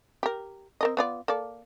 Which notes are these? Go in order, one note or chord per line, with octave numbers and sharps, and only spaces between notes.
G4 A#4
C4 A#4 D#5
B3 F4 D5
A#3 A4 D5